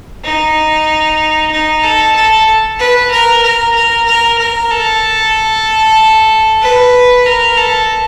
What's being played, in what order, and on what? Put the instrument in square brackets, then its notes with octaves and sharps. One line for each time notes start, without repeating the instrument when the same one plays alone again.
[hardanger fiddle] D#4
D#4
A4
A4
B4
A#4
A#4
A#4
A#4
A#4
A4
B4
A#4
A4